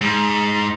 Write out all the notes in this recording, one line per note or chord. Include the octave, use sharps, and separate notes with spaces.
G#2